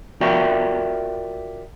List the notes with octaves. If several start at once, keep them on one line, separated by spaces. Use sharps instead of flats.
F4 F#4 A#4 D5 E5 G5